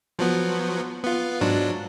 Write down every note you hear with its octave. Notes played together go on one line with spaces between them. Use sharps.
F3 F#3 B3
B3 F4
G#2 F#3 D4